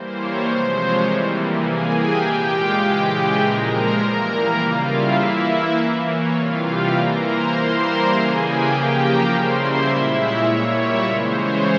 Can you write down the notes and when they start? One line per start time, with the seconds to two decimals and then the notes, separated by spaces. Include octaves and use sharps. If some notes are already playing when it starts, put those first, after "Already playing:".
Already playing: E3 G3 A#3 C5
0.16 C#5
0.46 C3 F3 G#3 C5
0.75 C#5
1.04 C3 E3 G3 A#3
1.63 E3 A#3 G#4 G#5
1.93 G4 G5
2.22 A#2 G#3
2.51 F4 F5
2.81 C#3 E3 G#3 G4 G5
3.11 G#4 G#5
3.40 A#2 F3 G#3 A#4 A#5
3.69 C5 C6
3.98 E3 G3 A#3 A#4 A#5
4.57 C#3 G3 A#3 F4 F5
4.87 E4 E5
5.16 E3 A#3
5.76 E3 A#3
6.05 C#5
6.34 C3 E3 G3 F4 F5
6.63 G4 G5
6.93 E3 A#3 A#4 A#5
7.22 C5 C6
7.52 E3 G3 A#3
7.81 A#4 A#5
8.11 C#3 E3 A#3 G#4 G#5
8.40 G4 G5
8.70 C#3 F3 A#3
8.99 A#4 A#5
9.28 C#3 G3 A#3 C5 C6
9.58 E4 E5
9.87 A#2 G#3
10.17 C#5
10.46 A#2 G3 A#3 C#5
10.75 E4 E5
11.04 C#3 E3 G#3 C5
11.34 C#5